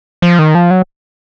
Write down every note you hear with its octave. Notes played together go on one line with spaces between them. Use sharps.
F3
D#3
F3
F#3